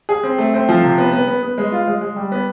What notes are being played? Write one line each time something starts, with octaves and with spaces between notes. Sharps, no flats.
G#4
C4
A3
C4
F3
C3
B3
B3
B3
B3
G#3
F4
G#3
G#3
G3
B3